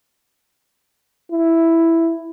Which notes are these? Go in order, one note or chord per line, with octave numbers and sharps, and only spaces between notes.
E4